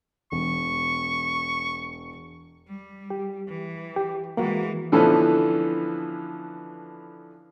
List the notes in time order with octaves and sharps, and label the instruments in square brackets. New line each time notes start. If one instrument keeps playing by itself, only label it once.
[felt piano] E1 [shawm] C#6
[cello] G3
[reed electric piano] G4
[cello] E3
[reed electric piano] G4
[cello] E3 G#3 [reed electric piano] A#3 F#4
[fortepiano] D3 E3 F3 B3 C#4 A4